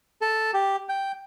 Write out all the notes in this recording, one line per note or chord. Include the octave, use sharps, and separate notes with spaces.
A4
G4
G5